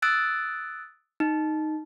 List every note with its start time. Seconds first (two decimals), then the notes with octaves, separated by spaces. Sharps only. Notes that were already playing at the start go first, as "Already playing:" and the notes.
0.02 D#6 E6 F#6 A6 D7
1.20 D#4